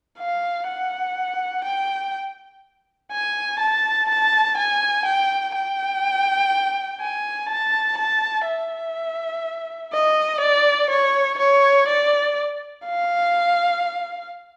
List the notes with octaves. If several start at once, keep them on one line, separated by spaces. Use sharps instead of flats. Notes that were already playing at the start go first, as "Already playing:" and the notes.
F5
F#5
G5
G#5
A5
A5
G#5
G5
G5
G#5
A5
A5
E5
D#5
D5
C#5
C#5
D5
F5